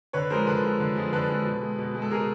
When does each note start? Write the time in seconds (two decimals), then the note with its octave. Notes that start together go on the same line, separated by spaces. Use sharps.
0.13 D3 B4 C#5
0.30 F3 G#3 A#4 C5
0.46 D3 A4 B4
0.64 F3 G#3
0.80 D3
0.96 F3 G#3
1.12 D3 A4 B4
1.29 F3 G#3
1.45 B2
1.61 G#3
1.78 B2
1.95 G#3
2.02 A4
2.11 B2 G#4 A#4